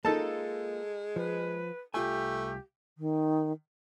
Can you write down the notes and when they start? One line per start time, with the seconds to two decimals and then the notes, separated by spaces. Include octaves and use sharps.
0.05 G#3 A#3 D#4 F4 A4 A5
1.16 F3 B4
1.94 C2 A3 F4 G4 G#5
2.98 D#3